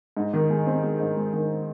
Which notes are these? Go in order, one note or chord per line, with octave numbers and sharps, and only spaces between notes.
G#2
D#3
G#3
C4
G#3
G#2
G#3
D#3